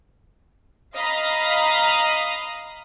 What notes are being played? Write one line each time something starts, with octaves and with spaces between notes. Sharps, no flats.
D#5 F5 A#5 B5 D#6